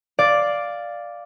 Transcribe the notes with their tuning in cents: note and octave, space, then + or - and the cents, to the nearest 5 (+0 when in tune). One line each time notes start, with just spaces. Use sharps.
D5 +0 F5 +0